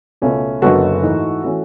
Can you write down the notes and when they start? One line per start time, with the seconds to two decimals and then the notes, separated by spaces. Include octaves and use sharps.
0.22 C#2 B2 A3 C#4
0.62 F#1 F#2 D3 G#3 B3 F#4 A4
1.03 G#2 E3 A3
1.43 E3 A3 C#4 F#4